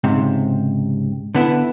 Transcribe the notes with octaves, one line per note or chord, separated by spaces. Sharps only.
C#2 G#2 C3
D3 B3 E4